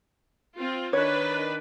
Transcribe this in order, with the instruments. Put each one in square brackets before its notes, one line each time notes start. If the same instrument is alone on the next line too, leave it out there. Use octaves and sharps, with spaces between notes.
[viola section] C4 F4
[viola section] D#3 D4 B4 [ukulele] C#5